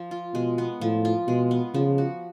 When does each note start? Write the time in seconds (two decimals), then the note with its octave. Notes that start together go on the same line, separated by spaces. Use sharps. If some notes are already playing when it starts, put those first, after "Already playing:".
Already playing: F3
0.11 F4
0.34 B2 G#3
0.58 B3
0.81 A2 F3
1.05 F4
1.27 B2 G#3
1.51 B3
1.74 C#3 F3
1.98 F#4